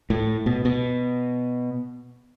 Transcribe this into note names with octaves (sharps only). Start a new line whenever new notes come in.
A2
B2
B2